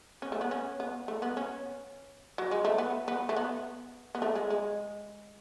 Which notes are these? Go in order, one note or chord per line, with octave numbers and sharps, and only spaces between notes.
C#4
A3
B3
C#4
B3
A3
B3
C#4
F#3
G#3
A3
B3
B3
A3
B3
B3
A3
G#3
G#3